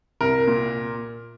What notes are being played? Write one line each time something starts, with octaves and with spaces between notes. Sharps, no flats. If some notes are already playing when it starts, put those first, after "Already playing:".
C2 A#4
A#2